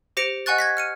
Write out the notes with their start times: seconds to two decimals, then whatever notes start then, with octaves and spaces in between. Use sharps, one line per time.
0.17 G4 C5 A#6 C#7 D7 F7
0.46 D#5 F#5 G#5 C#6 F#6 A6
0.58 G#6 A#6 B6
0.77 F6 C#7 D#7